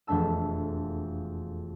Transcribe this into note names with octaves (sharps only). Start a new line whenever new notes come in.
E1 F2 A3 D4 A5 E6